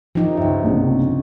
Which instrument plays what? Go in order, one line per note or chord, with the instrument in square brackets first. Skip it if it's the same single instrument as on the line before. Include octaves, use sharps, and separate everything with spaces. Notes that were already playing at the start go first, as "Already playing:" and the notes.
[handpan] F3 D#4 [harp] G4
[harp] C#2 G2 [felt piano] E5
[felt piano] A#1 C3